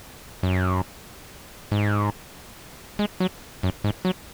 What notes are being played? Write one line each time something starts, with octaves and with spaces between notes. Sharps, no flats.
F#2
G#2
G#3
F#3
F#2
G#2
F#3